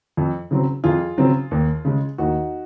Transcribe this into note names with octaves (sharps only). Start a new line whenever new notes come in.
F2
C#3 F#3 C4
F2 F4 G#4
C#3 F#3 C4
D#2
C#3 G#3
D#2 D#4 F#4